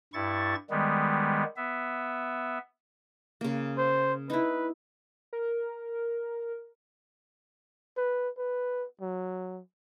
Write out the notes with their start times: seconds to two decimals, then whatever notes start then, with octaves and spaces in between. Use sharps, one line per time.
0.13 G2 E4 C#6 A6
0.70 D#3 G3 G#3 B3
1.57 B3 E5
3.41 C#3 A#3
3.78 C5
4.30 D#4 E4 B4
5.33 A#4
7.97 B4
8.37 B4
9.01 F#3